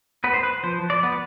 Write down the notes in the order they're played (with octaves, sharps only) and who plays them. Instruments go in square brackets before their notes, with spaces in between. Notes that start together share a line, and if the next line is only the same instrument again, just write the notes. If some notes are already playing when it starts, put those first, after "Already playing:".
[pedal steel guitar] B3 B4
C5
B4
F3 C5
D5
B3